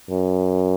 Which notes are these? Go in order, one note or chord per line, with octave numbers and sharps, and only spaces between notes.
F#2